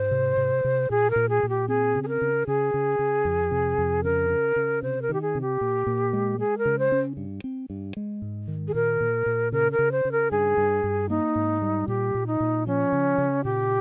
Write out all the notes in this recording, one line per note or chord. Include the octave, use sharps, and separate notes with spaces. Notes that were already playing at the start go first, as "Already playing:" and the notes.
Already playing: G#2 C5
C3
C3
C3
A#2 G#4
A#4
A#2
G#4
A#2
G4
C4 G#4
C#3
G#4
A#4
C#3
C#3 G#4
C#3
C#3
F2
C3
F2
C#3 A#4
C#3
C#3
C3 C5
A#4
D#3 G4
G#4
C3
G4
A#2
A#2
G#3
G#3 G#4
A#4
C#3
C5
C#4
G2
C4
G2
G#3
G#2
D#3
G#4
A#2 A#4
A#2
A#2
C#3 A#4
A#4
C#3
C5
C#3
A#4
G2 G#4
G2
G2
A#3 D#4
G#2
G3
A#2 G4
A#2
D#4
A#2
F3 C#4
C#3
C#3
A#2 G4